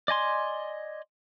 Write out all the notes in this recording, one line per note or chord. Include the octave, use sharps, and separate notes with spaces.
D5 D#5 G#5 C6